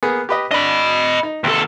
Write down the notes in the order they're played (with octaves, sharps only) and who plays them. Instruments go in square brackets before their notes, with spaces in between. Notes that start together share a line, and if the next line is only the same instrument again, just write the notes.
[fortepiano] A#3 B3 G#4
G4 B4 D#5
[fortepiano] D4 [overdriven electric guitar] D#5 B5
[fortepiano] D#4
[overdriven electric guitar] D#2 A4 [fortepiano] C3